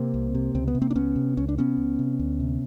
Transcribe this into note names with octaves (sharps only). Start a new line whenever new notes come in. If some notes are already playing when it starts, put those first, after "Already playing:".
Already playing: C3 A#3 C4
C2
C3
C#2 C4
B3
C3
A#3 C4
D4
C#2 B3 C#4
C3
C#2 C#4
D4
C3 B3 C#4
C#2
C3
D2
C3